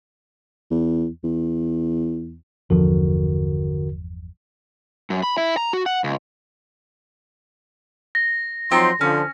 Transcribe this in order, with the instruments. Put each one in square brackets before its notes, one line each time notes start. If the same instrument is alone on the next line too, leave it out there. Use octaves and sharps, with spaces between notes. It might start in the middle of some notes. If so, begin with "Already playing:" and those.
[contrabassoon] E2
E2
[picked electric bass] G1 E2 F3 [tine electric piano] D3 F#4 A#4
[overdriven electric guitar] F#2
B5
E4
A#5
F#4
F#5
C#2
[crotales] A#6
[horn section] F3 F#3 C6 [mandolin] C4 D#4
[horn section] D3 F3 [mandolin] C#4